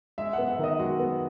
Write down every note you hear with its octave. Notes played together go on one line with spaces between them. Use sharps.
G#3 E5
B3 F#5
E5
D#3 D#5
G#3 F#4
B3